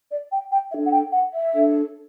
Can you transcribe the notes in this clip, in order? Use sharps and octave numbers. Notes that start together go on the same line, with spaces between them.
D5
G5
G5
D4 A4 C#5 E5
F#5
G5
F#5
E5
D4 A4 C#5